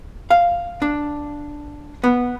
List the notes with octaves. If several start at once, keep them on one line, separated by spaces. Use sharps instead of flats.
F5
D4
B3